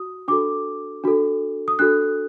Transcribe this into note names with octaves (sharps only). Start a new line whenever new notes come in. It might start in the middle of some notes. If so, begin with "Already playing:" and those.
Already playing: F#4 D#6
D4 F#4 A4 D6
D4 F#4 A4
D#6
D4 F#4 A4 F#6